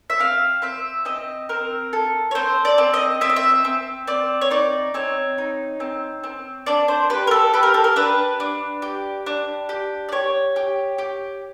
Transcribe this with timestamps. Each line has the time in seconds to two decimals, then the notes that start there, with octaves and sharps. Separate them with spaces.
0.10 E5
0.20 C4 F5
0.62 C4 E5
1.05 C4 D#5
1.49 C4 A#4
1.93 A4
2.31 C#5
2.35 C4 C5
2.65 D5
2.78 C4
2.94 D#5
3.21 C4 E5
3.30 D#5
3.36 E5
3.65 C4
4.07 C4 D5
4.41 C#5
4.51 D#4 D5
4.94 C4 C#5
5.38 D#4
5.80 C4
6.23 C4
6.66 D4 D5
6.88 C5
7.10 G4 B4
7.27 A#4
7.31 A4
7.53 G4 B4
7.63 A#4
7.74 A4
7.84 A#4
7.96 D4 B4
8.40 D4
8.82 G4
9.26 D4
9.69 G4
10.09 D5
10.12 G4 C#5
10.56 G4
10.98 G4